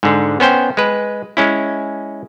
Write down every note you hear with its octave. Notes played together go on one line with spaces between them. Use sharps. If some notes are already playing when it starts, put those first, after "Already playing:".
G#2 D3
B3 C#4 C5 G5
G#3 B4
G#3 C#4 E4